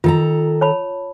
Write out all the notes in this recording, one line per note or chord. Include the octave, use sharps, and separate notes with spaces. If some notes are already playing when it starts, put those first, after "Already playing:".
D#3 F4 A4 A#5
C#5 A5 B5